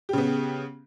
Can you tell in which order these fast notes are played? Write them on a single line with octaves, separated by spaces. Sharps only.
G4 C#3 B3